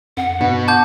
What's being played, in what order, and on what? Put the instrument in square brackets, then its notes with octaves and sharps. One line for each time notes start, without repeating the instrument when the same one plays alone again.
[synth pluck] F2 [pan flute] F#5
[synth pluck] G2 [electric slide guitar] B2
[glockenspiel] A5 D6 G6